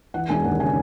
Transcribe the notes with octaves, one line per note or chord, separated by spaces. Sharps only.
E3 F#5
E1 G#5
D#2 F#5
C#3 G#5